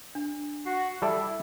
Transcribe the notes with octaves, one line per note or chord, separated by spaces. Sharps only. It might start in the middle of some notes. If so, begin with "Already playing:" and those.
D4
F#4 C7
G3 E4 A4 D5 E5 E6